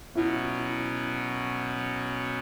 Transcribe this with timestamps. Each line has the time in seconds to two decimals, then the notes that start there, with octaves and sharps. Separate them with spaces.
0.15 B2 F#3 C#4 E4